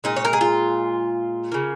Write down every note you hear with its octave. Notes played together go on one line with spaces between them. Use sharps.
A#2 G#3 D#4
C#5
A#4
G#4
F4
C#3 A#3